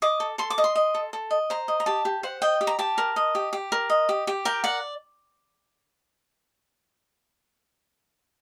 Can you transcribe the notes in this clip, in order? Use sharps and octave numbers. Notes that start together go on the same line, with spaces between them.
D#5 D6
A4
A4 C6
D6
D#5
C6
D#5
A4
A4
D#5
C5 A#5
D#5
A#5
G4 A5
G4
C5 F#5
D#5 G5
G4
A#5
G4 A5
A#4
D#5
G4
G4
A#4
D#5
G4
G4
A#4 G5
D5 F#5